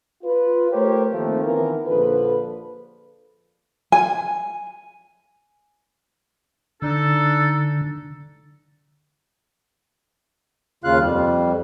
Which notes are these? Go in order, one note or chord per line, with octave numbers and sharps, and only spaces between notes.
F4 B4
A3 G4 A#4 C5 C#5
D#3 F3 A3 A#3 C4
D#3 E3 B3 C4 F4 A#4
A#1 D3 F3 A4 B4
G#5
D3 D4 D#4 A4
D#2 C#3 F4 F5 F#6
F2 G3